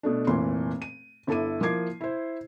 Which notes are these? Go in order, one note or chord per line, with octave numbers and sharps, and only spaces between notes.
B2 A3 D4
F1 A#2 E3 C6
D#7
G1 E4 A4 D6 D#7
F3 A#3 E4 D6 G#6 C7
E4 C5